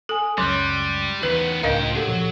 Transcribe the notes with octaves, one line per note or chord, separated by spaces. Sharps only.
A4 G#5 D#6
C#2 F#2 F#3 G3 C6 F#6
E2 D#3 B3 B4
C#2 A2 F3 D4 A#4 D#5 F5 G5
F#3 G4 A4
A#2 F3